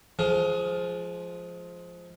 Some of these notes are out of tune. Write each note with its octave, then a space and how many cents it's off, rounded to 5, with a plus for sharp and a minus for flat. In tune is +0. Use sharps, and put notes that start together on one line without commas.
F3 +0 G#3 +20 F4 +15